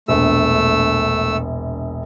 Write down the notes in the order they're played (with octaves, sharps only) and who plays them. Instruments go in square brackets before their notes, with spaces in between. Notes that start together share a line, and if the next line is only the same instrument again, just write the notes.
[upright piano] E1 A#1 [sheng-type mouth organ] A3 E6